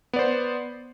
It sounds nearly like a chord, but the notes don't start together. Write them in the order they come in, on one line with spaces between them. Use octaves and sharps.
B3 D5 C5